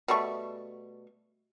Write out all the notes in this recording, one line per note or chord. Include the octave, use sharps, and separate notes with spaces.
B2 G3 A3 C#6